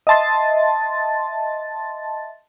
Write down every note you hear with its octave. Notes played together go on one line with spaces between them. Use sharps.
D#5 E5 A5 C6 A6